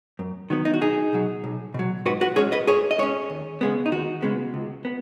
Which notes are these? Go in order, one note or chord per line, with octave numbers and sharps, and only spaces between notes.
F#2
D#3 F#3 B3
D#4
F#4
B1 D#4 G#4
B2 F#3
B1
B2 F#3
G#2 F#4 B4
F#4 B4
G#3 C#4 G#4 C#5
B4 D#5
G#2 G#4 C#5
D#5
G#3 C#4 G#4 C#5
D#2
C#3 G#3 B3
D#4
D#2 F#4
C#3 G#3 B3
C#2
B3